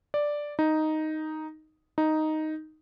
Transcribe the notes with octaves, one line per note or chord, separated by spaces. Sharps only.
D5
D#4
D#4